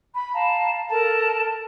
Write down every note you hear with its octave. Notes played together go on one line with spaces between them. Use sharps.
B5
F5 A5 A#5
A4 A#4 A5